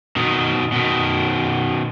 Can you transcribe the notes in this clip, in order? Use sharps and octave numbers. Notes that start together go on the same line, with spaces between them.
B2 D#3
B2 D#3